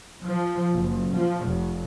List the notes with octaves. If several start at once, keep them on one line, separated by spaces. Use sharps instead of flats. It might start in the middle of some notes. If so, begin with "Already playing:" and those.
F3
F#1
F3
F1